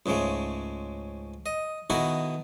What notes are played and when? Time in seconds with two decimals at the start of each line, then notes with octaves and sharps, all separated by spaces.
0.06 C#2 G#2 C#3 G#3 A3
1.46 D#5
1.90 B2 D#3 D#4 E4 F#4 A4